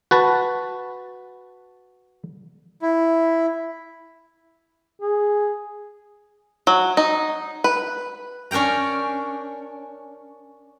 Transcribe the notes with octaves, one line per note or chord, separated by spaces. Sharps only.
F#4 B4 A5
E4
G#4
F#3
D#4
B4
C#4 D4 A#4 G5 A#5